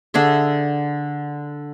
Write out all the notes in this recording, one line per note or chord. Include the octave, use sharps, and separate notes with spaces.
D3 D4 G#4 E5